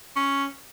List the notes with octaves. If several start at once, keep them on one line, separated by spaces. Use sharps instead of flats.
C#4